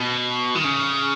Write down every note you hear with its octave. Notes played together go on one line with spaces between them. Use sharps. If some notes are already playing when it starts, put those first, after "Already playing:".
Already playing: B2
D#3
C#3